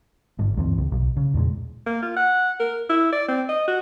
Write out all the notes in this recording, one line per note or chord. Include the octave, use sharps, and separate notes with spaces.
G1 G#2
D2 G2 E3 C4
C#2
B1
C#3
E2 A#2 G3 G#3
A#3
F4
F#5
A#4
E4
D5
C4
D#5
F#4